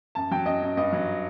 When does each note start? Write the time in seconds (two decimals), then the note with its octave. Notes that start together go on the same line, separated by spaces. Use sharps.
0.15 F#2 A5
0.31 F#3 G5
0.46 F#2 D#5
0.62 F#2
0.77 G2 D#5
0.93 F#3